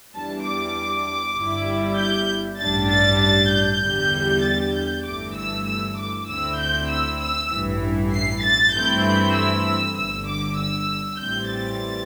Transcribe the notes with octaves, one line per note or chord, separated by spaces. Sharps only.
E2 E3 G3 D4 A5
D6
G1 G2 G3 E4
G6
A1 G2 G3 D4 A6
A6
A6
G6
E2 D3 G3
A6
G6
G1 G2 E3 A3 D6
E6
E6
D6
D2 D3 C4 E4 E6
G6
E6
E6
A1 G2 E3
C7
A6
G2 E3 A3 C4 E4 G6
E6
G1 G2 D3 E6
D6
E6
A1 A2 E3 G3 C4 G6
A6